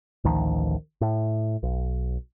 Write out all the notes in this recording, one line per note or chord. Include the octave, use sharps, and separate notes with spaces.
A1 D2 D#3 F3
A2
B1